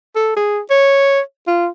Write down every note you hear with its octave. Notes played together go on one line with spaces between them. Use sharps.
A4
G#4
C#5
F4